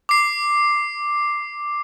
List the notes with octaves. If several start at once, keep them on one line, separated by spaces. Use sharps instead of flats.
D6 C7